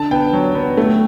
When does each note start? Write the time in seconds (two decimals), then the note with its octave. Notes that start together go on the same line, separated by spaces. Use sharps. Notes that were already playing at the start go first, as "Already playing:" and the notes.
Already playing: D3 A5
0.11 B3 G5
0.33 F#3
0.55 B3
0.77 A3